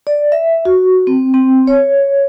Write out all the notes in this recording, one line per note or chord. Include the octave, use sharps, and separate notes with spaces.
D5
E5
F#4
C4
C4
C#5